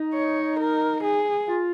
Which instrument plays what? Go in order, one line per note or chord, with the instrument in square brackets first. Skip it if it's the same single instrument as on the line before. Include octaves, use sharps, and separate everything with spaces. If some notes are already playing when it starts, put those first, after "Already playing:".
Already playing: [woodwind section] D#4
[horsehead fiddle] C#5
A#4
G#4
[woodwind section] F4